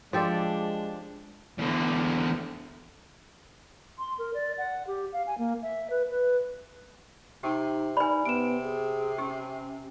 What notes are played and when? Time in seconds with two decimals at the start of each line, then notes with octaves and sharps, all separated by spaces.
0.13 F3 G#3 D4 G4 A4 C5 D5
1.58 E2 D3
3.99 C6
4.19 A#4
4.34 D5
4.58 F#5
4.87 G4
5.13 F5
5.27 G#5
5.38 A#3
5.63 E5
5.90 B4
6.10 B4
7.43 C3 D#4 G4
7.97 D#4 B4 D5 G#5 B5
8.25 C3 B3 D7 E7
8.63 G#4
9.18 C#4 G4